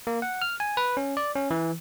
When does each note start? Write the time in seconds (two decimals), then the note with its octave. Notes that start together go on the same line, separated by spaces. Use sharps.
0.07 A#3
0.22 F#5
0.42 F6
0.60 G#5
0.77 B4
0.97 C#4
1.17 D5
1.36 C#4
1.51 E3